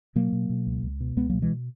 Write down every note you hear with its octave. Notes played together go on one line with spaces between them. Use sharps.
B2 F#3 A#3
B2
B2
C#2
C#2
B2
C#2 G#3 B3
F#3 A#3
B2
E3 G#3